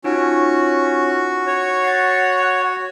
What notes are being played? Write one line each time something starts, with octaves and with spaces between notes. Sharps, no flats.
C#4 D#4 F4 F#4
C#5
F#5 A6 C7